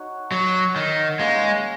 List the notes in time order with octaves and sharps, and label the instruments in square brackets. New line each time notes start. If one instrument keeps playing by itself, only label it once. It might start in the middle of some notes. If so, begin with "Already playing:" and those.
Already playing: [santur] D#4 F#4 C#5
[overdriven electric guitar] F#3
D#3
[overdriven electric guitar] G#3 [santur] A#3 C#4 G#4